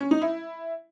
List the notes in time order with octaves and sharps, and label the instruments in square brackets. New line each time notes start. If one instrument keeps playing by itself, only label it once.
[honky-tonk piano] C#4
D#4
E4